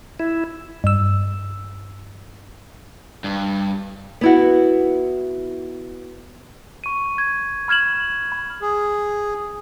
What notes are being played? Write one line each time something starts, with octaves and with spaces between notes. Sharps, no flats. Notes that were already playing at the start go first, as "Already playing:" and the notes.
E4
G2 E6
G2
B3 E4 F#4
C#6 D#7
G#6
B5 F6 G#6 E7 F#7
B5
G#4